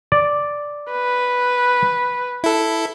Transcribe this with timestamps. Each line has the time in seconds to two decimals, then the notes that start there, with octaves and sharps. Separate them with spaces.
0.12 D5
0.91 B4
2.44 E4 A4